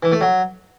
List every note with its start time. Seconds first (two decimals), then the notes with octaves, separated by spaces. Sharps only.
0.03 E3
0.12 A3
0.21 F#3